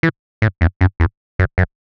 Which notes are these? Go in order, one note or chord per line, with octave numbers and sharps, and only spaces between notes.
E3
A2
E2
F#2
E2
F#2
F#2